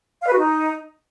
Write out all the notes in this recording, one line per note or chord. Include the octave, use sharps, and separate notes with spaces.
F5
B4
F#4
D#4